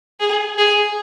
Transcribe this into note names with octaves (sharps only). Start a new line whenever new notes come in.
G#4
G#4